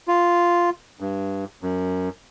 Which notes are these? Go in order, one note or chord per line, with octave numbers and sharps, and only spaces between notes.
F4
G2
F#2